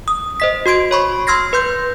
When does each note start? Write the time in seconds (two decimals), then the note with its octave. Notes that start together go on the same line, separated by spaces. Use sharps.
0.08 D#6
0.40 C5 D#5 B6
0.66 F#4 C6 G#6 D7
0.91 C#5 B5 C#6
1.27 C6 E6 F6 G#6 A#6 C7
1.53 B4 C6 G6